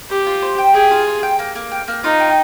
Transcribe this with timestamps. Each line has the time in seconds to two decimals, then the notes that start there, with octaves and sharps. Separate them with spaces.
0.10 G4 C5
0.27 F4
0.42 C5
0.58 G5
0.74 G#4 G5
0.91 F4
1.07 F4
1.23 G5
1.39 A#3
1.55 A#3
1.71 G5
1.88 A#3
2.04 D#4 F4
2.20 G5